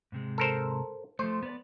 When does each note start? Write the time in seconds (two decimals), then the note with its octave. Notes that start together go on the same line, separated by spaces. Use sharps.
0.12 G#2 C3 G#3
0.38 A4 A#4 C5
1.19 F3 A3 C5
1.43 B3 D5